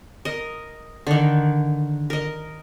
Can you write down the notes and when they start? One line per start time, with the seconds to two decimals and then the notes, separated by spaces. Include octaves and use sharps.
0.25 A#4 D#5
1.07 D3 D#3
2.10 A#4 D#5